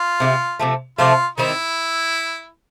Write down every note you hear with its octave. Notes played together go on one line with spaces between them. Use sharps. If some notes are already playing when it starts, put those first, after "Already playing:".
Already playing: F4
C3 D#3 G3
C3 F3 A3
C3 F3 A3 F4
D#3 G3 C4 D#4 E4